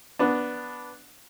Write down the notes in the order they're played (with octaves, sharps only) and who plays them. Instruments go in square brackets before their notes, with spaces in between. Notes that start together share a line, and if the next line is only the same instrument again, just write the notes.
[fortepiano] B3 D4